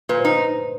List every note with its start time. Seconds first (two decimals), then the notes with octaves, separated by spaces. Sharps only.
0.09 A#2 B4
0.20 C5
0.25 D#4